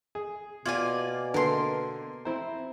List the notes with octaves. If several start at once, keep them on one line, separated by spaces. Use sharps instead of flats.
G#4
B2 A#3 F4 D5 G#5 G#6
D3 A#3 A#4 B4 D#5 A5 C6
C4 E4 C5 A#5